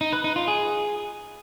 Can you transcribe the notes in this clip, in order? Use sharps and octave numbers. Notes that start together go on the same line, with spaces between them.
D#4
B4
D#4
F4
G#4